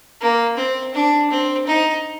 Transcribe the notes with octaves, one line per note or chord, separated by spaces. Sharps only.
A#3
C4
D4
C4
D#4